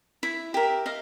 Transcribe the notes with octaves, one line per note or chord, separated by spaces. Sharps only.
E4 E5
G4 A#4 E5
D#5 F5